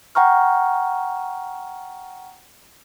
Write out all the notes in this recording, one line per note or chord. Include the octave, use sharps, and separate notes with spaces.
F#5 G5 A#5 C#6 F6